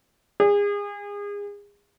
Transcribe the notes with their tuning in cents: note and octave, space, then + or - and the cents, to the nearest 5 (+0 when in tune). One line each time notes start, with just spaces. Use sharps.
G#4 -30